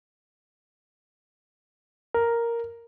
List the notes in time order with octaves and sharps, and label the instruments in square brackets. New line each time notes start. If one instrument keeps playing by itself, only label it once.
[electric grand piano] A#4